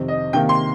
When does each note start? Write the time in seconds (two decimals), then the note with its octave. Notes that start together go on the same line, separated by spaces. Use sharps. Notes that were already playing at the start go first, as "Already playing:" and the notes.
Already playing: F2 C3 D#3 C4
0.08 D#5
0.33 C3 D#3 A#3 G5
0.49 C6